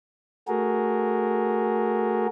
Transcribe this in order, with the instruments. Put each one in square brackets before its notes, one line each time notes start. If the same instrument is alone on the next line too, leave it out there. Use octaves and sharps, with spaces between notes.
[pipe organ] A3 F#4 G#4 A#4